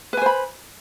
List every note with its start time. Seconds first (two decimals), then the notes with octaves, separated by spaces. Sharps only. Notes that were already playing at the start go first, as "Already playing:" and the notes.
0.13 B4
0.17 G#5
0.22 C5
0.26 B5